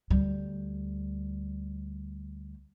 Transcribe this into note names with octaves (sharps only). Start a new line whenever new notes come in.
D2 G3